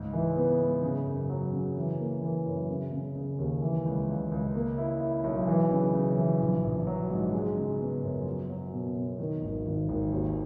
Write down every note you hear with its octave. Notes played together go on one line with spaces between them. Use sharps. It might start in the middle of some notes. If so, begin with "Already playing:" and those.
Already playing: C#2 G#2
E3
B3
G#2
C#3
F#2
F#3
C#3
E3
A#3
E3
F#2
C#3
C#3
C#3
D#2
E3
C#2
C#2
C#2
A#3
E4
E4
B1
E3
C#3
C#3
E3
A#1
A#1
F#3
G#2
G#3
C#3
B3
F#2
F#3
F#3
B2
B2
D#3
G#1
G#1
G#1
D#2